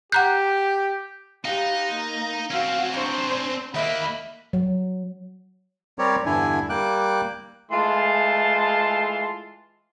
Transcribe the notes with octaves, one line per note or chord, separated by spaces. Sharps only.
G4 F#5 A#5 F#6 G6
D#4 F4 G4 B4
A#3
C4 C#4 F#4 F5
D4 C5 A#5 C#6
D#2 A#3 D#5 E5 F#5 B5
F#3
G3 C4 G4 A#4 C#5 D5
E2 G2 D3 D4 E4 G#5
G3 A#3 G5 D6 F#6
E3 G#3 A3 F4 A5 C6